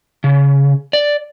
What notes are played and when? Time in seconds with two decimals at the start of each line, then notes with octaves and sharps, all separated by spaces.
0.24 C#3
0.93 D5